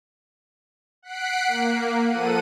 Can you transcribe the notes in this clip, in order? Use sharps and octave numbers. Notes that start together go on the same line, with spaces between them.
F#5 F#6 B6 C7 D7
A#3
F3 A4 F#5 D#7